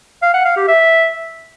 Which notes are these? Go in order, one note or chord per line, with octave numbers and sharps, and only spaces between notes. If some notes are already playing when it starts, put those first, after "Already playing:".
F5
F#5
F5
G4
E5